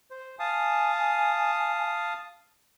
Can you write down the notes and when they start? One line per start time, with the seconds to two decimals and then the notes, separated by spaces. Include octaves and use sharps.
0.10 C5
0.39 F5 G#5 A5 D#6